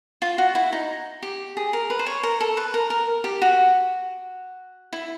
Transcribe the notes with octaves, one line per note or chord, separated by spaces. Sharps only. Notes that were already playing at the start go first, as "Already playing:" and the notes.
F4
F#4
E4
D#4
G4
G#4
A#4
B4
C5
C#5
A#4
A4
B4
A#4
A#4
G4
F#4
E4